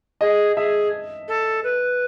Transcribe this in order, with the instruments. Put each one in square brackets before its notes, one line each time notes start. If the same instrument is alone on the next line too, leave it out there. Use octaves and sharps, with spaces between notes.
[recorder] G#4 [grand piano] D#5
[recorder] G#4 [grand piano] E5
[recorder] A4
B4